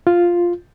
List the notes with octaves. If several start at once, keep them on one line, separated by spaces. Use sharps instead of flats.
F4